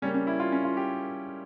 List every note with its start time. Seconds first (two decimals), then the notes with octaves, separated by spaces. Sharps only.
0.02 C#3 G3 A#3 C#4
0.14 C#4
0.27 E4
0.40 F4
0.52 C#4
0.65 F4
0.77 G4